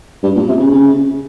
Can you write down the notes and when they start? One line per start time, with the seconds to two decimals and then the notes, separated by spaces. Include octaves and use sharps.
0.23 G2
0.36 A#2
0.49 C3
0.60 C#3
0.72 C#3